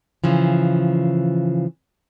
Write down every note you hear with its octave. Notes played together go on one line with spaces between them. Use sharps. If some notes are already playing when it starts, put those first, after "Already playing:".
C#3 E3 F3